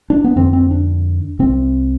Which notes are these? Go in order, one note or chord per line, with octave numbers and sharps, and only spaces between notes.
D4
B3
F2 D3 C4
C4
D4
C2 C3 C4